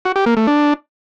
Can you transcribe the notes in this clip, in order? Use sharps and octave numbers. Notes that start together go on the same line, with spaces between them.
F#4
G4
A#3
A3
D4